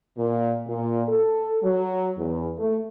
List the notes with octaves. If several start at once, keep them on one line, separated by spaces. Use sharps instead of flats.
A#2
A#2
A4
F#3
E2
A3